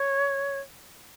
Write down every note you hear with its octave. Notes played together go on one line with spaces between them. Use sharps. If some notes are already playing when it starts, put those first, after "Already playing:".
Already playing: C#5